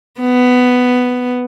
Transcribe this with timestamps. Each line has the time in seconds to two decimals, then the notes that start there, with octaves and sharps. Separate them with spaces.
0.20 B3